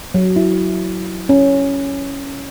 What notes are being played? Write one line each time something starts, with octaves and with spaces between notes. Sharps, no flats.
F#3
E4
C#4